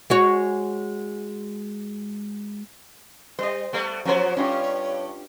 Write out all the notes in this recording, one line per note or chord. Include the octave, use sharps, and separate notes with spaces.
G#3 F#4 C#5
G3 C5 D#5
G3 A3 B3
F3 F#3 B3 C#4 C5 C#5
G2 C#4 F4 G4